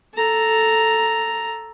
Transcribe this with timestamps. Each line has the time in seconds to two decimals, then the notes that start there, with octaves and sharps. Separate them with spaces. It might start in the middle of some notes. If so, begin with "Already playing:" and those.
0.14 A4 A#5